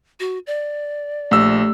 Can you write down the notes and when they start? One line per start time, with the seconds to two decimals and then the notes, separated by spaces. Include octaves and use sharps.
0.20 F#4
0.47 D5
1.31 A#1 A3 G4 E6